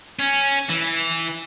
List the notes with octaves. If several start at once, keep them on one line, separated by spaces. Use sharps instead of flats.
C#4
E3